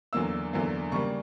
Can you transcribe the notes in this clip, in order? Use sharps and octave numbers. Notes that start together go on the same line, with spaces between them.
E2 D3 F#3 A#3 E6
E2 D3 F#3 A#3
C#3 G3 A#3 C#6